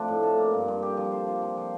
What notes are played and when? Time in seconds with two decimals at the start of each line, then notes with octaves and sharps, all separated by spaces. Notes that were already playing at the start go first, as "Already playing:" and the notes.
Already playing: F3 A3 C4 D4
0.08 A2
0.23 A4
0.38 A#3
0.53 G2
0.68 G2
0.83 G4
0.97 F3
1.12 C5
1.28 F4
1.42 F3
1.57 F3